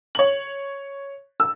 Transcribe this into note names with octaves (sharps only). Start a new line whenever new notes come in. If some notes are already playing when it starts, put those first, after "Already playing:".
C#5 F#7
E6